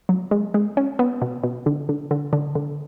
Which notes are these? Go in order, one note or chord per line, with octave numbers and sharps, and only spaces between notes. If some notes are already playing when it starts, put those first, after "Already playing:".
F#3
G#3
G#3
C#4
B3
B2
B2
D3
D3
D3
D3
D3